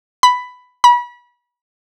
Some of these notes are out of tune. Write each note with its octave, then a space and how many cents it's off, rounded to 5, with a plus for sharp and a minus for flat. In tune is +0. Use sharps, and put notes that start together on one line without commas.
B5 +10
B5 -30